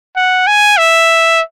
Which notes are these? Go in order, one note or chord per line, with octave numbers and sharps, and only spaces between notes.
F#5
G#5
E5